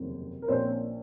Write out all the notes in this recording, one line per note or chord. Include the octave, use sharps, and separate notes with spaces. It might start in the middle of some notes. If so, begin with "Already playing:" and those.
Already playing: F1 D#2 C#3 F#3 C4
A#4
A#1 A#2 F3 A#3 C4 C#4 C5